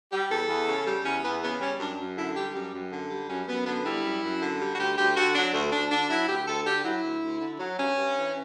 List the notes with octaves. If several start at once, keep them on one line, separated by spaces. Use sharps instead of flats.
G3 G4
E2 A4
E2
C#3
G3
E2 C#4
E2 B3
C#3 B3
G3 C#4
F#2 D4
F#2
D3 E4
G3 G4
F#2 G4
F#2
D3
G3
F#2 C#4
F#2 B3
D3 B3
G3 E4
F#2
F#2
D3
G3
F#4
D2 G4
D2 G4
D3 F#4
F#3 D4
D2
D2 D4
D3 D4
F#3 E4
D2 G4
D2 A4
D3 G4
F#3 E4
D2
D2
D3
F#3
G2 C#4
G2
E3